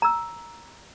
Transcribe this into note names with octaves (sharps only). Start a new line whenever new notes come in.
A#5 E6